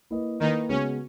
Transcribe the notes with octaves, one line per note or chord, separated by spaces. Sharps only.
A#3 E4 B4 D#5
D#3 A#3 D#4 E4 B4 D#5
C#3 G#3 B3 C#4 F#4